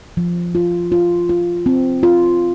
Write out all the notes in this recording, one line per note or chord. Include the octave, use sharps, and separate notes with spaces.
F3
F4
F4
F4
C4
F4